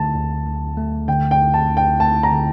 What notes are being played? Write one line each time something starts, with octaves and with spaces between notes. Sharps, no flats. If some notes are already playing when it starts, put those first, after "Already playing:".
Already playing: D2 D3 A3 A5
D2
D2
A3
D3 G5
G5
D2
A5
D2
G5
A3 A5
A#5
D3